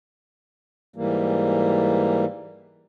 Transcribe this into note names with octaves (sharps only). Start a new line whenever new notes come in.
G#2 E3 G3 A#3